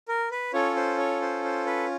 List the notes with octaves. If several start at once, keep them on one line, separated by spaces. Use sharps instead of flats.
A#4
B4
C#4 F4 A4 C#5
C5
C#5
C5
C5
B4